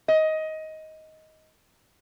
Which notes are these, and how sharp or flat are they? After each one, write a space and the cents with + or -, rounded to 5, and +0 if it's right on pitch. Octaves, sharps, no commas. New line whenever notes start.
D#5 +15